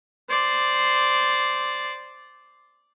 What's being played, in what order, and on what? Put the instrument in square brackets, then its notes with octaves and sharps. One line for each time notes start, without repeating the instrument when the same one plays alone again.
[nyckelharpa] C5 D5